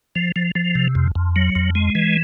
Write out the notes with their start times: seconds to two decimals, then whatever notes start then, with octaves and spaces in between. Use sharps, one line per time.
0.16 F3
0.36 F3
0.55 F3
0.75 C3
0.95 F2
1.15 F2
1.36 F#3
1.55 F2
1.75 G#3
1.95 E3